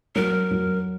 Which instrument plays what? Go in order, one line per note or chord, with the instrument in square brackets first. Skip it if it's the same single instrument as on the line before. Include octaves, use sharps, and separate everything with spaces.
[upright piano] F#3 [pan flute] A#4
[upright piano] F#3